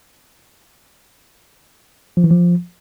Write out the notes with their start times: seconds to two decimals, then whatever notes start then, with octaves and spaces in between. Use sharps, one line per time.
2.17 F3
2.24 E3
2.31 F3